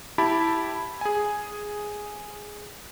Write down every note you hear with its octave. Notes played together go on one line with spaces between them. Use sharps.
E4 G4 A5 B5
G#4 G#5